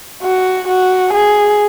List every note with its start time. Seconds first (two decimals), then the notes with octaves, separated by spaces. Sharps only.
0.23 F#4
0.68 F#4
1.14 G#4